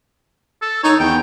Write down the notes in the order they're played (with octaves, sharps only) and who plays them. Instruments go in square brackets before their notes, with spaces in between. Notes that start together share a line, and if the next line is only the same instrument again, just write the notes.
[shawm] A4
[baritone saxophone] D#4 [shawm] C#5
[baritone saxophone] E2 [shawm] G5